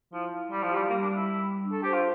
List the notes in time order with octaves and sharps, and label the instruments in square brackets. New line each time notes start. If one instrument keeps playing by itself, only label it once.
[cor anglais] F3 [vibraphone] E4
[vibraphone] E4
[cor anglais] G3 [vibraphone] E4
[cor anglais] F3
[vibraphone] G4
[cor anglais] G3
[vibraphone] G3 [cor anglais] A#3
[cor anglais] D4
[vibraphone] G3
[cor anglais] E4
[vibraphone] G3
G3
D4
[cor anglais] A4
[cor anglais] G4 [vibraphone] C5
[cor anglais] F4